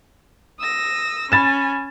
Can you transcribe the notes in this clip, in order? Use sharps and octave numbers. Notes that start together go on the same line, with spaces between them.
D#6 E6 A#6
C#4 G#5 B5 A6 E7